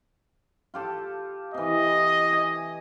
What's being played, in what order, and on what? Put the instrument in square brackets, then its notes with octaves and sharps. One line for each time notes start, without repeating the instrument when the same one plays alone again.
[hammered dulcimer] F4 G4 A4
[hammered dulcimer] C3 E3 [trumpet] D#5
[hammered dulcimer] G#5